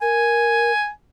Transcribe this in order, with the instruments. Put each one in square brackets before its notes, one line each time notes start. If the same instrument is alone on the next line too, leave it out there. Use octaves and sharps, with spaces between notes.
[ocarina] A#4 [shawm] G#5